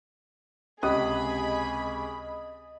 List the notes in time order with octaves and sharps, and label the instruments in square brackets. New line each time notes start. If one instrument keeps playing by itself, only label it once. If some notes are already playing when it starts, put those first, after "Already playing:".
[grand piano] C#2 C3 [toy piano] C#4 G4 [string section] G#4 B5 [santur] D#5